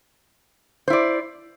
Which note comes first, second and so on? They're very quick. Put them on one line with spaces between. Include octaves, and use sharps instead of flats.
C5 E4 D5